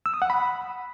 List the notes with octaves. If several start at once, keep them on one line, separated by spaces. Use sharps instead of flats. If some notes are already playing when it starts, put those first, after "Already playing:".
E6
D#6
F#5
B5